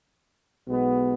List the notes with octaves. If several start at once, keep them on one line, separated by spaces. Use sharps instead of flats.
B1 B2 G#3 B3